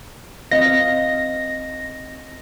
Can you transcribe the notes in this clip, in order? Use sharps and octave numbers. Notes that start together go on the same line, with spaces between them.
C4 D#5 F5 A#6